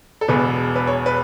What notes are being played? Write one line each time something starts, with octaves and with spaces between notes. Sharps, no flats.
A4
E1 E2 B2 B4
B4
C#5
B4